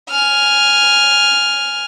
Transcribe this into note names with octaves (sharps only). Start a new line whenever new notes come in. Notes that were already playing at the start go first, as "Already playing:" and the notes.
G#5 F6